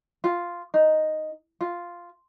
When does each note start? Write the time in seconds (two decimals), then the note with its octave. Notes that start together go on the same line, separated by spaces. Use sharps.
0.24 F4
0.74 D#4
1.61 F4